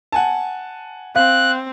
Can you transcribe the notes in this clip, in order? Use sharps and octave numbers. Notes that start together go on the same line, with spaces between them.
F#5 G#5 A5
C4 F5 F#6